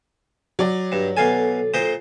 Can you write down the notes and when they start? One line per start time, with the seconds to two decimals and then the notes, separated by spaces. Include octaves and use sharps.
0.59 F#3 D5
0.92 G2
1.17 B2 A4 F5 G#5
1.74 A#2 C5 D#5